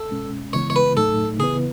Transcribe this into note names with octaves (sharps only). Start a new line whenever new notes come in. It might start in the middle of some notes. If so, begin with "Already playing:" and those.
Already playing: A4
B2 G#3 C#4
C#3 E3 G#3 B3 E4 C#5
C#5
B4
A2 F#3 A3 D#4 A4
C#3 E3 B3 E4 G#4 B4